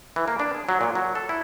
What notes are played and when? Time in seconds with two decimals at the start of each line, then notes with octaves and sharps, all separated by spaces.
0.16 E3
0.28 A#3
0.40 D4
0.54 G#4
0.69 F#3
0.81 A#2
0.95 F#3
1.15 A4
1.29 E4